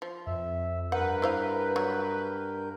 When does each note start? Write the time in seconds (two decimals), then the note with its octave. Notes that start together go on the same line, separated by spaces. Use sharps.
0.02 F3
0.27 F2 E5
0.92 G2 A#4 B4 F#5 G6
1.22 E4 C5 F5
1.76 F#3 F#4